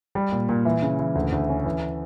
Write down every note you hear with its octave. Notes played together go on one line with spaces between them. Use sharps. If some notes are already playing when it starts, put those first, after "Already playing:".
G3
A#2
A#2
E3
C#3
E3
D2
D2
C#4
E3